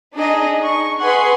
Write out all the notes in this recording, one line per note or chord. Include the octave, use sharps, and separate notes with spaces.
D4 D#4 G#4 D#5
C#6
G#4 B4 F#5 C6